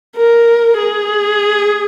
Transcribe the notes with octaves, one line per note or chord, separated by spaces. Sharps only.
A#4
G#4